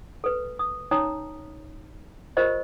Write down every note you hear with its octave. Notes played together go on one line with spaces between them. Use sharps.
A4 B4
D#6
C#4 D#4 C#5 A#5 D#6
F4 G4 A#4 C5 D#5 B5